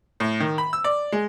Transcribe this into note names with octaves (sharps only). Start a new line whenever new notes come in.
A2
D#3
B5
E6
D5
G#3